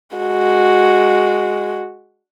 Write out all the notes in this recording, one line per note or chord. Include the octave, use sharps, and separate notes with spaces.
G#3 F#4